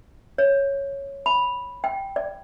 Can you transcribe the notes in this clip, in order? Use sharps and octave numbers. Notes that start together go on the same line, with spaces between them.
C#5
B5
G5
D5